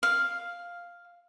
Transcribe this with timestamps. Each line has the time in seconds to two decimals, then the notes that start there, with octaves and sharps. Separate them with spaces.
0.03 F5